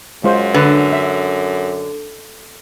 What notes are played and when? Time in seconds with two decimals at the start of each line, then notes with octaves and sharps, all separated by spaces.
0.24 F#2 G#3 F4 C5
0.54 D3 B4
0.92 E5